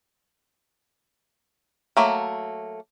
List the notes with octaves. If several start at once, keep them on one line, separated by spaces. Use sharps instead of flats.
F#3 A3 A#3